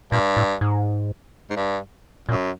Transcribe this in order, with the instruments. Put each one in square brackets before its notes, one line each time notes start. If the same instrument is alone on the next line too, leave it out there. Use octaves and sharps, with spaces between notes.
[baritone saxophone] G2 [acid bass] A#2
[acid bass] A2
G#2
[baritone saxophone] G#2
G2
[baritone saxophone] F#2 [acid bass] A#2